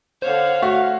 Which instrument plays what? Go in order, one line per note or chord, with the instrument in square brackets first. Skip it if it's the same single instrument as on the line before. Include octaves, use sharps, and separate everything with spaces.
[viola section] D3 F5 F#5 [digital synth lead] C5 [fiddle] C#5
[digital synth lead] A3 [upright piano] F#4